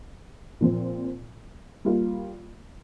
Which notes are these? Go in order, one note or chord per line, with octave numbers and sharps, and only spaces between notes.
A#2 F3 C4
G3 A#3 F4